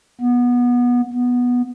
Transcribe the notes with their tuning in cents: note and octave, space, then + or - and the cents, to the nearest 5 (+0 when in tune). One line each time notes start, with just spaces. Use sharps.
B3 -20
B3 -10